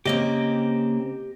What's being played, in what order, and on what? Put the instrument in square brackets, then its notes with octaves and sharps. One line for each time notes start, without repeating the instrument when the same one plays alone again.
[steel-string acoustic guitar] C#3 A#3 C4 [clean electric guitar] G4 D#5